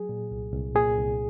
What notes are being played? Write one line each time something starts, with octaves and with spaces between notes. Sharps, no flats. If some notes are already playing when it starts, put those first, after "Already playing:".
Already playing: F#3 G#4
A#2
C2
C2
A#2 G#4
C2